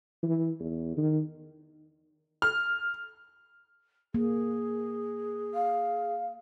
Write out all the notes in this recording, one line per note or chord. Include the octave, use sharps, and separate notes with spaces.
E3
E2
D#3
F6
A#3 G#4
F5